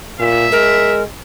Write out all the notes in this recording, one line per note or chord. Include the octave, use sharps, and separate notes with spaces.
A#2 E5
G#3 A#4